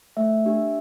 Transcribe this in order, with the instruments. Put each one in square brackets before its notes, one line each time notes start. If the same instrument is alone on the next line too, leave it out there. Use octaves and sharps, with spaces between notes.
[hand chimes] A3 E5
D4 G4